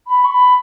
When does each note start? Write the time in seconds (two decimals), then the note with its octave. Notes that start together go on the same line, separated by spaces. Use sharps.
0.07 B5
0.24 C#6
0.31 B5